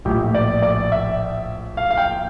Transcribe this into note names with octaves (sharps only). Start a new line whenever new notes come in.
A#1 A2 F3 G4
D5
D5
E5
F5
F5
G5